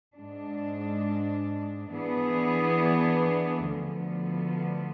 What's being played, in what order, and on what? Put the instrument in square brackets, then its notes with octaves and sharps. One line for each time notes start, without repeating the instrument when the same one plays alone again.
[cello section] G#2 G#3 D4
E3 B3 D4 G#4
D2 D3 F3 B3